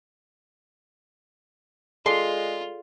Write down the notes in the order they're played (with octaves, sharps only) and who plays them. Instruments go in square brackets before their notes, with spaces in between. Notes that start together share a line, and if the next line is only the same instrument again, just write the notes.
[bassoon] G#3 [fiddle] F4 [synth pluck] G#4 A4 D5 [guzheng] C6